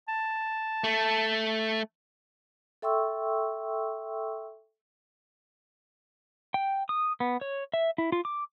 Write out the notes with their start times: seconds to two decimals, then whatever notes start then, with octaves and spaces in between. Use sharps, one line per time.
0.08 A5
0.84 A3
2.82 A4 E5 G5 C6 C#6 E6
6.54 G5
6.89 D#6
7.20 B3
7.41 C#5
7.74 E5
7.98 E4
8.12 F4
8.25 D6